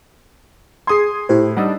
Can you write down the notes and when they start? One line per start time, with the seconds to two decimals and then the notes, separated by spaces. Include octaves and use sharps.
0.87 G#4 C6 D#6 G#6 C7
1.29 A2 E4 G4 C5
1.57 G3 D4 D#4 F#5 A5 E6